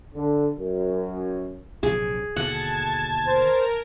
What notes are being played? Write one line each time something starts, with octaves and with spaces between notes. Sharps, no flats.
D3
F#2
A#1 C3 F#3 G#4
D#2 B2 D3 F#5 A5 G#6
A#4 C5